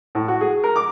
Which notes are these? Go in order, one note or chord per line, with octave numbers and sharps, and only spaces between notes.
A2
F#4
G#4
A#4
D6